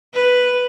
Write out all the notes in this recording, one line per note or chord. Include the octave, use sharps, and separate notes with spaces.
B4